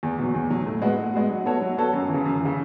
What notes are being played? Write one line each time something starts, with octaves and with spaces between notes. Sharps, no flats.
E2
B2 F#3
E2
B2 F#3
A2
G#3 B3 F#4
A2
G#3 B3 F#4
F#3
B3 F#4 A4 C#5
F#3
B3 F#4 A4 C#5
F#2
C#3 E3
F#2
C#3 E3